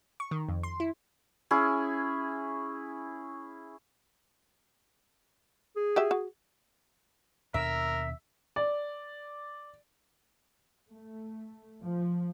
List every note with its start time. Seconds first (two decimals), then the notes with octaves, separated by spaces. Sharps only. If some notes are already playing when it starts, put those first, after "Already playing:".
0.20 C#6
0.31 D#3
0.49 F2
0.63 C6
0.80 E4
1.51 C#4 E4 G#4
5.76 G#4
5.96 F#4 G4 E5
6.11 F#4
7.54 D#2 B2 D4 A#4 E5
8.56 D5
10.91 A3
11.84 F3